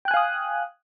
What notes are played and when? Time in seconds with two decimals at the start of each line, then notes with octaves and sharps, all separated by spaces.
0.05 G5
0.08 F#6
0.11 G#5
0.14 F5
0.17 D#6